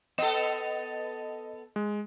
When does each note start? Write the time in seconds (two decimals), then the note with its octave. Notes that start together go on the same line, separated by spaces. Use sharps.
0.18 B3 A4 D#5 E7
1.76 G#3